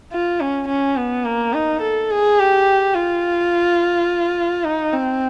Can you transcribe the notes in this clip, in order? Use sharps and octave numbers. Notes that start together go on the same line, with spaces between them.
F4
C#4
C#4
B3
A#3
D#4
A4
G#4
G4
F4
D#4
C4